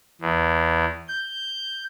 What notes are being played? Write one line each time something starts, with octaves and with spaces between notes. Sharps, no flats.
E2
G6